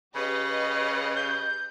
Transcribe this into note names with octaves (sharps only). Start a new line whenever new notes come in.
C#3 G4 B4 D#5
G6